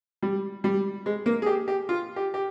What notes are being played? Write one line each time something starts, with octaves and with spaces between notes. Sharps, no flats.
G3
G3
G#3
A#3
G#4
G4
G4
F4
G4
G4